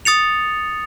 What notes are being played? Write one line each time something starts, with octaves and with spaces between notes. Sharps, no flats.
D#6 A6 C#7 F7